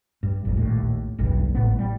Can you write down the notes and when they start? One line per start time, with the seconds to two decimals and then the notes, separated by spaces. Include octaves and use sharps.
0.23 G2
0.45 G1 F2 G#2
0.57 A#1 D#2 A2
1.19 F#1 B1 E2 G2
1.55 G#1 A2 B3
1.79 G3